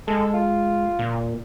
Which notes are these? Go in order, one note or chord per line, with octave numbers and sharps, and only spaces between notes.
G#3 A4
F4
A#2